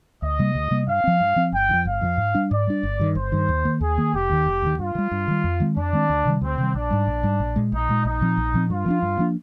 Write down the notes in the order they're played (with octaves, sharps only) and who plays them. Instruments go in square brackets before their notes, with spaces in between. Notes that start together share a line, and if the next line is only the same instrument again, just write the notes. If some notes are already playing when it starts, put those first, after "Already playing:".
[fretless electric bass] D2 [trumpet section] D#5
[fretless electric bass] C3 G3 A#3
D2
C3 G3 A#3
[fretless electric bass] G2 [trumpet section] F5
[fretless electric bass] F3 C4
G2
F3 C4
[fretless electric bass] G1 [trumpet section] G5
[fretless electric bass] F2 D3
F3
[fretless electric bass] G1 [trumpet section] F5
[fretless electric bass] F2 D3 F3
G#2
G3 D4
[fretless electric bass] G#2 [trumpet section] D5
[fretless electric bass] G3 D4
G1
G2 D#3
[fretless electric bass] G1 [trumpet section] C5
[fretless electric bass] G2 D#3
D#2
D#3 A#3
[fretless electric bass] D#2 [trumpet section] G#4
[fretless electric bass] D#3 A#3
[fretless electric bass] F1 [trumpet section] G4
[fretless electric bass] D#2 D#3
F1
D#2 D#3
[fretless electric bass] G2 [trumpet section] F4
[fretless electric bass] D#3
G3
G2
D#3 G3
F2
D#3 G#3 C4
[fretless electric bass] F2 [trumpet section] D4
[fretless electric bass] D#3 G#3 C4
D2
C3 D#3 G3
[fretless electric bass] D2 [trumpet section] C4
[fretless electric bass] C3 D#3 G3
[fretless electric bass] A#1 [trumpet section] D4
[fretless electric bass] G#2 G3
A#1
G#2 G3
A#1
A#2 G#3
[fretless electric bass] A#1 [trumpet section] D#4
[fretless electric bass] A#2 G#3
[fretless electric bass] A#1 [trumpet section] D#4
[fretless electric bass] A#2 F3 C4
A#1
A#2 F3 C4
[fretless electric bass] G2 [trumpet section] F4
[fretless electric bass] F3 A#3 D4
G2
F3 A#3 D4